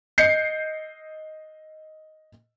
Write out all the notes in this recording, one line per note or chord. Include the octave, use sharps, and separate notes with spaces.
D#5 G6 C7 C#7